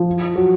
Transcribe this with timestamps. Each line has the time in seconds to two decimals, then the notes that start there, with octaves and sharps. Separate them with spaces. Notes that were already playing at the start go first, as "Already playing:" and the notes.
Already playing: F3
0.36 F#3